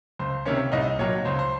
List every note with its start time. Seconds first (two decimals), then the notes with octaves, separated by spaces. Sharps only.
0.19 C#2 C5
0.46 C3 D#3 A#3 C#4 C#5
0.72 C2 D#4 D#5
0.99 A#2 F#3 C#5
1.25 C#2 C5
1.39 C5